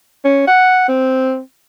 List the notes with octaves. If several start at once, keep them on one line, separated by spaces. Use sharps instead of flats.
C#4
F#5
C4